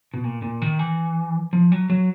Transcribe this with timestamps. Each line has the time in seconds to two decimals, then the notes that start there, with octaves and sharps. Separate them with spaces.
0.14 B2
0.24 A#2
0.42 A#2
0.62 D#3
0.79 E3
1.53 F3
1.72 F#3
1.90 F#3